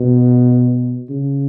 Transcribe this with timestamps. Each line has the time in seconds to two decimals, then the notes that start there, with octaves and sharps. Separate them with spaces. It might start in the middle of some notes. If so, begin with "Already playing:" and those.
Already playing: B2
1.10 C#3